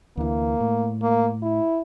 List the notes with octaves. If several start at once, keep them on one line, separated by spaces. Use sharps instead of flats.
D2 E3 A#3
A2
A#3
E4